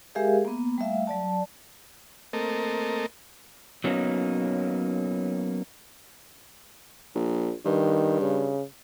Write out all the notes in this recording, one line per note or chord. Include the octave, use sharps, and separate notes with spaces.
G#3 G4 G#4 A#4 E5 F5
A#3 B3
G3 A3 E5 F5
F#3 D5 A5
A3 A#3 C4 A4 A#4 D#5
F#3 A#3 B3 C#4 D#4
A#1
G2 D#3
C#3